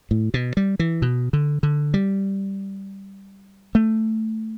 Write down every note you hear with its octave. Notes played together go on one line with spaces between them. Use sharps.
A2
B2
G3
E3
B2
D3
D3
G3
A3